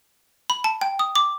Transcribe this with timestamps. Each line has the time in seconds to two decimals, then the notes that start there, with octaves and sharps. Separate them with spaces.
0.50 B5
0.64 A5
0.81 G5
0.99 D#6
1.16 D6